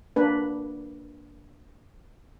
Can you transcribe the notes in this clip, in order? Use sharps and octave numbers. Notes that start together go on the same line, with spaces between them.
A#3 D4 B4